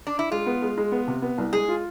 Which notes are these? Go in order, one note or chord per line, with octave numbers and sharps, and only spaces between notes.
D4
E4
G#3 F4
B3
G#3
G#3
B3
C3
B3
C2
G#3 G#4
F4